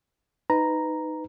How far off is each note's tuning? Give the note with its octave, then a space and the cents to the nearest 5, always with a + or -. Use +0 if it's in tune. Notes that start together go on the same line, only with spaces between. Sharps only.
D#4 +0 B4 +15 A#5 +0